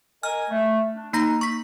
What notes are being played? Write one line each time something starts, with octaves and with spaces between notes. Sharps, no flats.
A#4 D#5 G#5 F6
A3
D4
A#3 D#4 A#5 A#6
C#6 B6